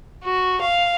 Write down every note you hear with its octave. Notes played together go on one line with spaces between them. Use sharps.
F#4
F5